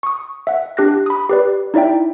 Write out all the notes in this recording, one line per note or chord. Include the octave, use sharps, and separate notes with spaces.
C#6 D#6
E5 F#5
D4 G4 F#6 A#6
B5 D#6
G4 B4 D5
D#4 E4 D5 E5 G5